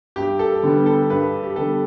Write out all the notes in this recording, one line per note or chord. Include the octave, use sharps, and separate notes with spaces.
G2 G4
A4
D3 G3 B3
A4
G2 B4
G4
D3 G3 B3 A4